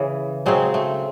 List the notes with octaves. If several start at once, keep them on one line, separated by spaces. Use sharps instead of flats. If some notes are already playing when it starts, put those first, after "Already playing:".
Already playing: C#3 E3
C#3 F#3 G#3 C4
A3